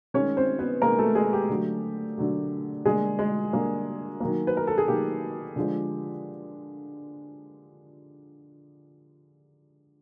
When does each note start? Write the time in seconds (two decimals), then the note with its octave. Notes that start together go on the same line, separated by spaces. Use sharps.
0.14 D#3 G#3 C#4 C#5
0.37 C4 C5
0.59 B3 B4
0.82 D#3 G#3 A#3 A#4
0.98 A3 A4
1.15 G#3 G#4
1.33 G4
1.49 D3 F#3 A3
2.18 D3 F#3 A3
2.85 D3 G3 G#3 A#3 G#4
3.19 G#3 G#4
3.53 D3 G3 A#3
4.20 D#3 F#3 A#3
4.47 B4
4.57 A#4
4.67 A4
4.78 G#4
4.88 D#3 F#3 A#3 G4
5.56 D3 F3 G#3